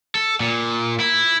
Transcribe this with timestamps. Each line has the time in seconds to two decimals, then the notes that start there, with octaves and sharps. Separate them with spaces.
0.15 A4
0.40 A#2
1.00 E4